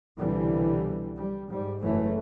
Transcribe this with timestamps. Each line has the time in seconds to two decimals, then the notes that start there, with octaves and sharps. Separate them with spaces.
0.18 C2 B2 D3 E3 G3
1.19 G3
1.50 G#2 G3
1.83 F#1 E3 F#3 A3